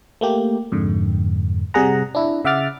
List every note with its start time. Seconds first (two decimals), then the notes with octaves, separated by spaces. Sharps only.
0.21 A3 A#3 G4
0.72 F2 G#2 D3
1.74 C3 G3 G#4 F#5 A#5
2.15 D4 E4
2.45 C#3 E5 F#5 D6 F6 A6